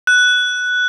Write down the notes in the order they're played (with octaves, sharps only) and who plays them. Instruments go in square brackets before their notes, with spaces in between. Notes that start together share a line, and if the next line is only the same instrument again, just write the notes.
[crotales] F#6